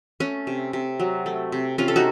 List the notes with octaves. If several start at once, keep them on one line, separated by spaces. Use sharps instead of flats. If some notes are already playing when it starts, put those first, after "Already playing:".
A3 C#4
C3
C3
F#3
A3
C3
C3 C#4 F4
A4
D#4 F#4